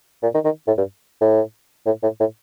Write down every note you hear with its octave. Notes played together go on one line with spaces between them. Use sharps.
A#2
D#3
D#3
A2
G2
A2
A2
A2
A2